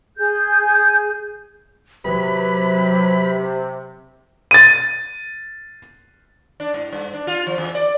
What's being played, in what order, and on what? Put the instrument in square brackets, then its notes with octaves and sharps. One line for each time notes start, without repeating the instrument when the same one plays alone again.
[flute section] G#4 G6
[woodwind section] C3 [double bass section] F#3 [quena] B4 [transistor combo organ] B5
[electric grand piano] A6 D#7
[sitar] D4
G#2
G2
D4
F4
F3
E2
D5